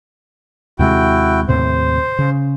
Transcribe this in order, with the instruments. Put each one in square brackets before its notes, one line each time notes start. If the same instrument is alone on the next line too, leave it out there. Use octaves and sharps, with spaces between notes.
[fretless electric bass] D#2 C3 G#3 [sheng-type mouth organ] E4 F#4 G5
[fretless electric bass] D#2 A2 C3 [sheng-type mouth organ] C5
[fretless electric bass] C#3